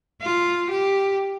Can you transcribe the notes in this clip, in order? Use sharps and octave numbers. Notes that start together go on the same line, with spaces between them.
F4
G4